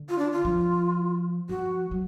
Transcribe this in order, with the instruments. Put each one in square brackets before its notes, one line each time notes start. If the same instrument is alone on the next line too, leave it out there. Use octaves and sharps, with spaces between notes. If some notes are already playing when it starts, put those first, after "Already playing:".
Already playing: [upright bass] D3
[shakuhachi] F4
D4
F4
[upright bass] F3
[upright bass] F3 [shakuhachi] F#4
[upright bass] F#3